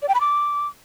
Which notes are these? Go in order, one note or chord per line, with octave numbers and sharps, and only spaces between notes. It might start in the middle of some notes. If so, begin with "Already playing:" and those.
D5
G5
B5
D6